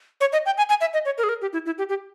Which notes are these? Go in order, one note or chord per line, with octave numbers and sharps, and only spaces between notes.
C#5
D#5
G5
G#5
G#5
E5
D#5
C#5
A#4
G#4
A#4
G4
E4
E4
G4
G4